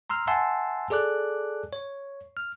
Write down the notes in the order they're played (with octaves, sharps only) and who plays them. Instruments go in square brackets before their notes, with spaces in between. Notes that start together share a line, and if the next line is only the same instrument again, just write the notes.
[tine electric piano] A#5 C6 E6 F6
E5 F#5 G#5 A5 C6 E6
G#4 A4 D5 D6 F#6
C#5
F6